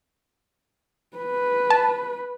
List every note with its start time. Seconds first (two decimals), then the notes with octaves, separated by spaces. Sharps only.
1.17 B4
1.70 A5